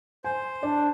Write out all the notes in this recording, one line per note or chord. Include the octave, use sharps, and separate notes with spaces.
C5 G#5
D4 D5